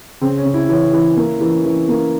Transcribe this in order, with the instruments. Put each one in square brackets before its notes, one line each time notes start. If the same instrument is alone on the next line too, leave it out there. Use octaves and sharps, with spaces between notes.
[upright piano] C#3 [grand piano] C4
[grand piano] C#4
[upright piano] C#3
[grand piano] E4
[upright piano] E3 [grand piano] C#4
[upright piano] E3
A#3
E3
E3
A#3